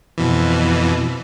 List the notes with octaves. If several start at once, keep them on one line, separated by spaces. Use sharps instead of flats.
F2 B2 E3